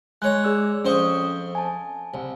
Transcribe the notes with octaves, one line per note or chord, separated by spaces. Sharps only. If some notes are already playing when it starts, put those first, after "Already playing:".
G#3 C#5 A#5 F#6
G#4 D5 E6
F2 C#4 C5 C#6 D#6
G#5 A5
C2